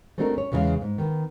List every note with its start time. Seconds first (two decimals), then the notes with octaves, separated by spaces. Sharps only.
0.18 A3 C4 D4 D#4 F#4 A#4
0.34 C#4 C#5
0.52 E2 C#3 G#3 A4 C#5 F5
0.81 G#2
0.98 D#3 B3